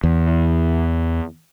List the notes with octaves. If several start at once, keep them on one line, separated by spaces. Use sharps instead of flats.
E2